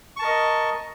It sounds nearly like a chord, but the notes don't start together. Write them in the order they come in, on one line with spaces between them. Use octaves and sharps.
C#6 A5 A#4 D#5